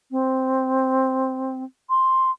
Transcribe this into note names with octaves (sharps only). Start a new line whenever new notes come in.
C4
C6